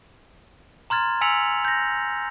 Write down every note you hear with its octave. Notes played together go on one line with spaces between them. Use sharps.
A#5 C6 F6 G#6 A6
G#5 E6 B6 C#7 F7 F#7
G6 A#6